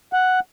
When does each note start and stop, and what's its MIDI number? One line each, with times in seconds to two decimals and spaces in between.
0.13 0.40 78